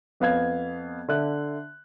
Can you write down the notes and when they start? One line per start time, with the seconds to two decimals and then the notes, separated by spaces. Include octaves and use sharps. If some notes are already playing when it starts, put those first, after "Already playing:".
0.20 F2 B3 F5 G#6
1.08 D3 E5 F#6